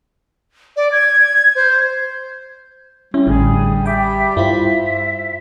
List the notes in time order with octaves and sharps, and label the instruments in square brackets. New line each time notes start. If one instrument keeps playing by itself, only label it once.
[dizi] D5
G#6
C5
[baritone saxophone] G3 [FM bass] C#4 [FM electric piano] E4
[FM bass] A1 [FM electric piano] A2 D3 [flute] G#4
[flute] E5 [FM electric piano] G5 D6
[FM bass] G2 [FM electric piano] E4 F4 C5 [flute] E5